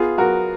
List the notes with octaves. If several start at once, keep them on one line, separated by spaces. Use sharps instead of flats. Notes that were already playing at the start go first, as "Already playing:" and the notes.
Already playing: B3 F4 G#4
F#3 F#4 A#4